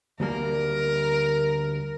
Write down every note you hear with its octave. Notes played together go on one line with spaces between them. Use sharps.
D2 G3 A#3 A#4